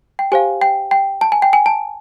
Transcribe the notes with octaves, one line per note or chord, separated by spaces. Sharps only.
G5
G4 C5 F5 G#5
G5
G5
A5
G#5
G5
G#5
A5